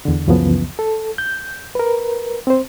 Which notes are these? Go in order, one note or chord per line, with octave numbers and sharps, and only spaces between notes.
E2 D3
C#2 F#2 C#3 E3 F3 B3
A4
G6
A#4 B4
C4 C5